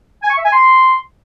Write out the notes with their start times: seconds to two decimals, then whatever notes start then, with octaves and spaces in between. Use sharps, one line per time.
0.23 G#5
0.30 C#6
0.38 E5
0.45 G#5
0.53 C6